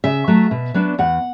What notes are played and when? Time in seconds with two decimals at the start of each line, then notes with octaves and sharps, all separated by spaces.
0.04 C#3 E5
0.28 F#3 A3
0.51 B2
0.74 F#3 B3 D4
0.99 E2 F#5